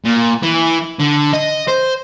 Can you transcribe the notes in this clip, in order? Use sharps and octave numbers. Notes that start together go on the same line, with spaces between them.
A#2
E3
D3
D#5
C5